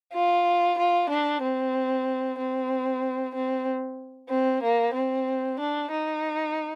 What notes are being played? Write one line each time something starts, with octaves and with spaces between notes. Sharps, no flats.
F4
F4
D4
C4
C4
C4
C4
A#3
C4
D4
D#4